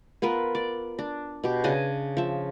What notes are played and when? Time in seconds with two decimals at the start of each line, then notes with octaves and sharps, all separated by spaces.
0.22 B3 F4 A#4 B4
0.55 D5
0.99 D4
1.44 B2 G4
1.64 C#3 D4 D#5 G#5
2.17 F3 E5